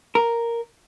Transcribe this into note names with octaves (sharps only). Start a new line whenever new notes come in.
A#4